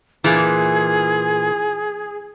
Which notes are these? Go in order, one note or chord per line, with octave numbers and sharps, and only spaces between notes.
A#2 E3 G#4